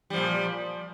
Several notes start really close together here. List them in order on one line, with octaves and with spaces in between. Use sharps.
G3 F3 A#2